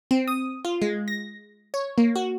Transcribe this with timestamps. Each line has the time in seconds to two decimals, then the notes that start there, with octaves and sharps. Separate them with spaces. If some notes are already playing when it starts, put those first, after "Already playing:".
0.11 C4
0.28 D#6
0.65 F4
0.82 G#3
1.08 A#6
1.74 C#5
1.98 A#3
2.16 F#4